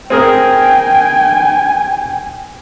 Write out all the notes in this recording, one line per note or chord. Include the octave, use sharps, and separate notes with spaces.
C4 G#4 A#4 G5 G#5